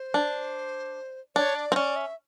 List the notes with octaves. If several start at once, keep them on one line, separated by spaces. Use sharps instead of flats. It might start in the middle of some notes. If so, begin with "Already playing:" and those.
Already playing: C5
D4
D4 C#5
D5
C4
C#4 D5
E5